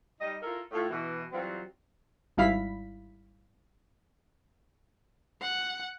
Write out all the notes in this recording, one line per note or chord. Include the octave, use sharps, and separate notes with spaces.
G3 D#4 D#5
E4 F4 A4 A#4
A2 F4
B2 E3
E3 F#3 G3 C4 F4 F#4
G#1 G3 E4 F5 B5 B6
F#5